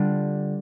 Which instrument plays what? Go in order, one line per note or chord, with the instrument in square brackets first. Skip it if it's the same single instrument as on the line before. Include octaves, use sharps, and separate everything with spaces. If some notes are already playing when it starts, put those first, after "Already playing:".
Already playing: [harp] D3 G3 D4 F4